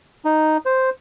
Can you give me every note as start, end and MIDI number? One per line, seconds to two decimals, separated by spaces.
0.25 0.57 63
0.66 0.90 72